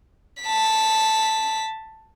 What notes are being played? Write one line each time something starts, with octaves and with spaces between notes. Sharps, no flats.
A5 B6